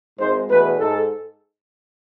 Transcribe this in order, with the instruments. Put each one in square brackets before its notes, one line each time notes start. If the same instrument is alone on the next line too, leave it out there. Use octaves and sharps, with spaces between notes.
[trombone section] G#1 G#2 G#3 C5
E2 B2 A3 B4
G#2 A4